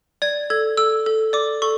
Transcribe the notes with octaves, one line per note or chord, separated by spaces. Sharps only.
D5 G#6
A4 G#6
A4 E6
A4
D5 D6
A4 C#6